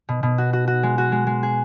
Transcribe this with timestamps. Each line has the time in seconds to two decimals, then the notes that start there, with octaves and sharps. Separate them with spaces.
0.09 B2
0.23 B2
0.38 F#4
0.53 F#4
0.68 F#4
0.83 G#3
0.98 F#4
1.12 G#3
1.27 G#3
1.43 G#4